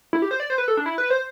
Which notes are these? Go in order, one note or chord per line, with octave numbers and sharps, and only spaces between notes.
E4
G4
C5
D5
C5
B4
A4
D4
E4
B4
C5